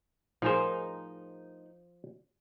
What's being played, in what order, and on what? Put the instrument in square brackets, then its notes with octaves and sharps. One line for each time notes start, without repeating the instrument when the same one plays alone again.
[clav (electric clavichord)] F3 C5 [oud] D#4 G#4 A#4